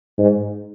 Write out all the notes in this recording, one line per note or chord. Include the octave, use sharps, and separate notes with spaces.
G#2